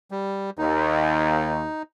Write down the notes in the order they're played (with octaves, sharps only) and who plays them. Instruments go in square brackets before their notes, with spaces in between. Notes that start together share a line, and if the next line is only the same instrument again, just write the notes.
[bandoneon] G3
[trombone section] D#2 [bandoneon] D#4